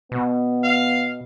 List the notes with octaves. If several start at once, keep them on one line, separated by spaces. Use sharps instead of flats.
B2 B3
F5